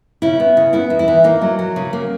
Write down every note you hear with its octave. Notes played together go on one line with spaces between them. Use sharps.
C#3 E4
B3
C#3
B3 E4
E2
E4
E3
A#3 D#4
F#3
F#3
C#3
A#3